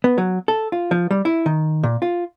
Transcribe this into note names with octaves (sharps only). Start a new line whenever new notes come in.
B3
F#3
A4
F4
F3
G3
E4
D#3
A#2
F4